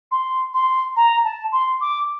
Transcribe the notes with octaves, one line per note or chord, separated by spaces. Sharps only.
C6
C6
A#5
A5
C6
D6